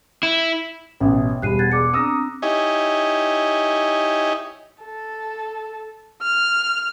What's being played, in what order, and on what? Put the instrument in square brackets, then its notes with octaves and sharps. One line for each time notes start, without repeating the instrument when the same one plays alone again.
[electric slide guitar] E4
[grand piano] A1 B2 [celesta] C#5 [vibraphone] E5 G5 D#6
[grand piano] E1 [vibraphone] G3 G4 B5 [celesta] F#6 C7 D#7
[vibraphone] F#5 [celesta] F#6 G#6 A6
[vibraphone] G#4 D5 A5 [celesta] D6 F#6 C#7
[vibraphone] C4 D4 A#5 [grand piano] D#6 E6 A#6
[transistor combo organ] D#4 E4 G4 C#5 D#5 G#5
[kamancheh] A4
F6